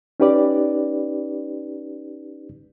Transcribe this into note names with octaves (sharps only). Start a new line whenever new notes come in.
C#4 D#4 G4 B4 D5